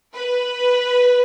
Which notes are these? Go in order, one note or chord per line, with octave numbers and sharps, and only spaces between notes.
B4